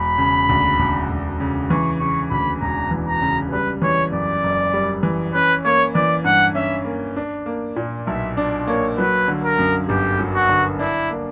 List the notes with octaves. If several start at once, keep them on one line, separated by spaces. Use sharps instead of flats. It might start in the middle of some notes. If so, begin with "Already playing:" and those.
Already playing: E1 B5
C#3
D2
E1
E1
C#3
E3 C#6
C#3 C#6
D2 B5
E1 A#5
E3
A#5
C#3
G3 B4
E3 C#5
F#2 D5
F#1
G3
E3
C#4 B4
A#3 C#5
E3 D5
G2 F#5
C#4 E5
A#3
D4
A#3
A#2
B1 E5
D4 D5
A#3 C#5
F#3 B4
D3
A#4
F#2
G1 G4
F#3
F#4
D3
D4 E4
A#3